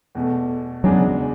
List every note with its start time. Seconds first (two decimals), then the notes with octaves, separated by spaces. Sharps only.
0.15 E2 B2 A3
0.84 E2 C#3 F#3 G#3 D4 G#4